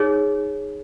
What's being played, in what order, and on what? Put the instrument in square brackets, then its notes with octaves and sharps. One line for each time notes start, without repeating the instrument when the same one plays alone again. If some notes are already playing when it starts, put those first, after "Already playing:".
Already playing: [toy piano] D#4 G#4 C#5